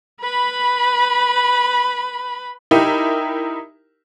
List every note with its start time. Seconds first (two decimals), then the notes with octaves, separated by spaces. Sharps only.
0.21 B4 B5
2.71 D#4 E4 G4 A#4